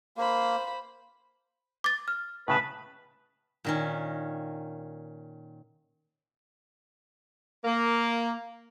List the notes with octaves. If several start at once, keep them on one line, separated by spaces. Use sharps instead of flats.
A#3 C5 B5
D6 A6
F6
A2 C#3 B4 A5
A#2 D#3 C#4
A#3